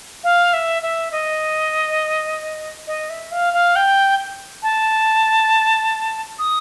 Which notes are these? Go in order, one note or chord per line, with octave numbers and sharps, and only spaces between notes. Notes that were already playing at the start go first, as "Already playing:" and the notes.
F5
E5
E5
D#5
D#5
E5
F5
F5
G5
A5
D#6